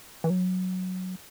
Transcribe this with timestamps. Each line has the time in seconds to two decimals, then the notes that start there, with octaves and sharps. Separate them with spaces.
0.24 E3
0.30 F#3